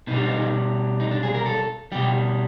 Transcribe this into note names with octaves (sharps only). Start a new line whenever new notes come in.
B2 G3 D4 D#4
D#4
D#4
D4
G#4
A#4
A4
B2 G3 G4